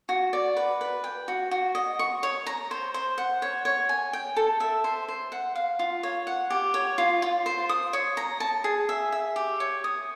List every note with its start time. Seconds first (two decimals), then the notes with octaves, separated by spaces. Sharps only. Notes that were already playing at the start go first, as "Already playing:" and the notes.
0.09 F#4
0.33 D5
0.56 B4
0.81 B4
1.04 G5
1.28 F#4
1.51 F#4
1.75 D#5
1.99 C#6
2.23 C#5
2.46 A#5
2.71 C5
2.94 C5
3.18 F#5
3.42 C#5
3.65 C#5
3.89 G#5
4.13 G5
4.37 A4
4.60 E5
4.84 C5
5.08 C5
5.32 F#5
5.55 F5
5.79 F4
6.03 C#5
6.27 F#5
6.50 G4
6.74 C#5
6.98 F4
7.22 F4
7.46 C5
7.69 D#6
7.93 C#5
8.17 A#5
8.40 A5
8.64 G#4
8.89 E5
9.12 E5
9.36 G4
9.60 C#5
9.84 D#6